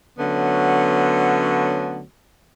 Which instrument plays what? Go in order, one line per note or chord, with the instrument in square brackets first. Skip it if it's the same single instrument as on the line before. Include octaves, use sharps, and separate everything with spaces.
[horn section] D3 F#3 A3 B3 C#4